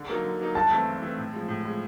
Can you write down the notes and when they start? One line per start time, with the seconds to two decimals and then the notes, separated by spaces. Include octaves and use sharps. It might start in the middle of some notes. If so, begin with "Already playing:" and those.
Already playing: D3
0.09 F#3 A#3 D#4
0.24 D3
0.40 F#3 A#3 D#4
0.55 G2 A5
0.71 E3 A3 C4
0.86 G2
1.02 E3 A3 C4
1.17 A2
1.33 F3 G#3
1.48 A2
1.63 F3 G#3